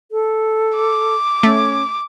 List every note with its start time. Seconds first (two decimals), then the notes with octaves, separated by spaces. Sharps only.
0.12 A4
0.76 D6
1.43 A3 C#4